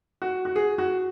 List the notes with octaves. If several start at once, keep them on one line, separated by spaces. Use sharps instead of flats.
F#4
F#4
G#4
F#4